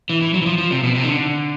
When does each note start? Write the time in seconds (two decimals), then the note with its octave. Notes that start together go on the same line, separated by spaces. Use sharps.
0.10 E3
0.22 E3
0.34 F#3
0.42 E3
0.46 F3
0.58 F3
0.71 C3
0.83 B2
0.95 C3
1.03 D#3
1.07 D3